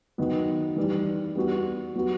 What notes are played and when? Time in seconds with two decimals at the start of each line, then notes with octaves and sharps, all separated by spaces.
0.18 D#3 F#3 B3
0.76 E3 G3 D#4
1.36 G3 B3 F#4
1.95 F#3 B3 F#4